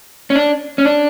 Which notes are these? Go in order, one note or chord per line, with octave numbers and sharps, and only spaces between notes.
C#4
D4
C#4
D4